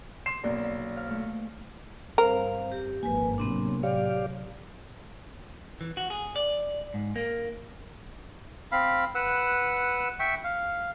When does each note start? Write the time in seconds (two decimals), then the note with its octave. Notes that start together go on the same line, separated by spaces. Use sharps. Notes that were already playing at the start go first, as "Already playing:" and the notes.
0.26 C6 C7 E7
0.44 B1 A#3 B3 C#4 G#4 D5
0.63 F5
0.97 C5 F5
1.10 A3
2.18 G2 C4 A#4 C5 F5
2.72 G4
3.03 G#1 G2 F3 A#3 B4 G#5
3.38 A2 C3 F#3 B3 C4 D4
3.83 G4 C#5 D5 F5
5.81 E3
5.97 F#4
6.10 G#4
6.36 D5
6.94 G#2
7.16 A#3
8.72 C4 F5 B5
9.15 B4 F#5 E6
10.20 E5 G5 C#6
10.44 F5